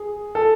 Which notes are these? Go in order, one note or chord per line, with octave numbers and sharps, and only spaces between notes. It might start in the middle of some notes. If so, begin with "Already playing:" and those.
Already playing: G#4
A4